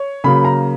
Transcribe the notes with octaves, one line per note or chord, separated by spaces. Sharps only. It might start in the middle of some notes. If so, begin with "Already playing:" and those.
Already playing: C#5
C#3 F#3 A#3 B5
A#5